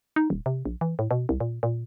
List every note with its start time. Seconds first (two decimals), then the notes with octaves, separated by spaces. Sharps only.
0.16 D#4
0.30 D#1
0.46 C3
0.66 A#1
0.81 E3
0.99 A2
1.11 B2
1.29 C2
1.40 A#2
1.63 A#2